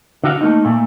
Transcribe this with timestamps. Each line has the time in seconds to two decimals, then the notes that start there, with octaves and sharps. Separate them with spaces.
0.24 D3 F#4 F5
0.41 A3 A#3 D#4
0.65 A#2 A3